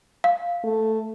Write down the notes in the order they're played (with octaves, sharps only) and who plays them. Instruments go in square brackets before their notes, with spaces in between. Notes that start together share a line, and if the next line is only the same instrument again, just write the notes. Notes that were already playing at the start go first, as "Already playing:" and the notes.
[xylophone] F5
[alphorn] A3